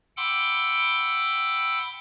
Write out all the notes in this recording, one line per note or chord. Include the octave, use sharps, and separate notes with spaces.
F#5 G5 B5 C6 D6 E6